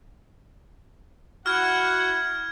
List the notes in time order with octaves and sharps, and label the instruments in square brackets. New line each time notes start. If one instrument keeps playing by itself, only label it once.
[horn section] E4 F#4 F#5 [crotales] F6 G#6